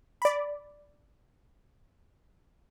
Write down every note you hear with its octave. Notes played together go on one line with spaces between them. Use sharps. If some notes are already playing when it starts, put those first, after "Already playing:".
D5 B5